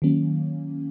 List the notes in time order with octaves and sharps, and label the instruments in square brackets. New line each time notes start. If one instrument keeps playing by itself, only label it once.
[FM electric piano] D#3 F#3 A#3 C#4